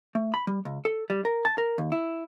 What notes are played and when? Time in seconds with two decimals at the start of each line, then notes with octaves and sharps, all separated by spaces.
0.15 A3
0.34 B5
0.47 G3
0.65 C#2
0.85 A4
1.10 G3
1.25 A#4
1.45 A5
1.58 A#4
1.78 D#2
1.92 E4